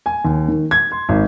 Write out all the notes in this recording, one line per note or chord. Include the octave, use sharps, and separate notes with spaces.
G#5
D#2
D#3
G#6
C6
G#1